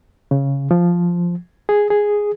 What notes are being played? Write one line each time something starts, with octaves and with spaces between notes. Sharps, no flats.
C#3
F3
G#4
G#4